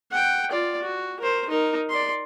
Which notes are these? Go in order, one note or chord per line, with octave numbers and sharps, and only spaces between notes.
F#5 G5
F4 D5
F#4
A#4 C5
D#4 A#4
D5 C6